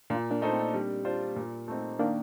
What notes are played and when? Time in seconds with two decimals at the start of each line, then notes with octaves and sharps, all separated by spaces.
0.10 A#2 D4 F4
0.31 A#3 D4
0.42 A3 D4 D#4 A4 C5
0.52 C4
0.73 G3
1.05 D4 F4 C5
1.36 A#2
1.68 A3 C4 D#4
1.99 D#3 A#3 D4